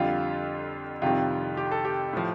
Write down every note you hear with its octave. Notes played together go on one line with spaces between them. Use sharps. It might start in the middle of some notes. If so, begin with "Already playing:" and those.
Already playing: F2 D3 G3 F4
F2 C3 D#3 G3 F4
G4
A4
G4
A2 F3